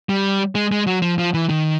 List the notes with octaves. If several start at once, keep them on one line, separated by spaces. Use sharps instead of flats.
G3
G#3
G#3
F#3
F3
F3
E3
D#3